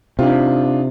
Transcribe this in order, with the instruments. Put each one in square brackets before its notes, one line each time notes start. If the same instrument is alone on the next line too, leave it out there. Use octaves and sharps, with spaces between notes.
[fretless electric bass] C3 [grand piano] D4 D#4 F4